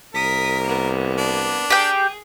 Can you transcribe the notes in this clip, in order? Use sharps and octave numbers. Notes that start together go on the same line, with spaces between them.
C2 A#4 D#6 B6
A#3 B3
D4
G4 G#4 G5